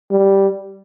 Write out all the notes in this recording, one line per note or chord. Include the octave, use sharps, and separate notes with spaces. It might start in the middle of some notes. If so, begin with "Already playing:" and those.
G3